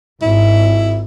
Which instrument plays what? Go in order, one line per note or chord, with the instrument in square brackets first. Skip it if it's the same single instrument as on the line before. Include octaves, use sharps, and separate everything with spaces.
[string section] G#1 G#2 [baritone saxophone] E4